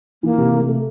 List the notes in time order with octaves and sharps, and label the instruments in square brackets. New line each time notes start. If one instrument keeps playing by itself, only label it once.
[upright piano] E3 [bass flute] A#3
[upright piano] C3
A3
A3